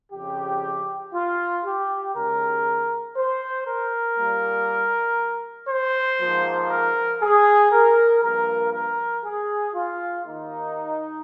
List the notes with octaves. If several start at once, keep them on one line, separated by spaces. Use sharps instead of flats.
F2 C#3 F3 G4
F4
G4
D#2 C#3 G#3 A#4
C5
A#4
A#2 G3 A#3
C5
G#2 F3 A#3
A#4
G#4
A#4
G2 F3 A#3 A#4
A#4
G#4
F4
D#2 D#3 A#3 D#4